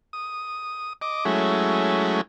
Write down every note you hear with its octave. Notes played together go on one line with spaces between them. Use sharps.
D#6
D#5 D6
F#3 G#3 A3 C#4 E4